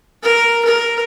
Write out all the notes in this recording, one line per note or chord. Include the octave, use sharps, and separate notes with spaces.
A#4
A#4